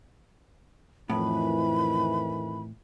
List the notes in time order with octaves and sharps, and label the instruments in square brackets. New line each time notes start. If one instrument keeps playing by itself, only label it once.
[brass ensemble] F2 D#3 E3 [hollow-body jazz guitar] A2 [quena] B5